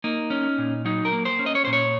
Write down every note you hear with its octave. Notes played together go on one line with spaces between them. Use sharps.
A#3 D#4
C#4
A#2
F#3 D#4
A#4
A#3
C5
C#4
D#5
C#5
A#2 C5
C#5